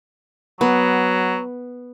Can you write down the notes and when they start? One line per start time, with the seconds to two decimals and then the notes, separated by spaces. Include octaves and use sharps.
0.61 F#3 B3